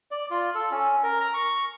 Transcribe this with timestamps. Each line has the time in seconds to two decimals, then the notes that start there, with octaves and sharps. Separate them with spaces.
0.11 D5
0.31 F4
0.55 A4
0.72 C#4
1.04 A#4
1.20 A#5
1.34 C#6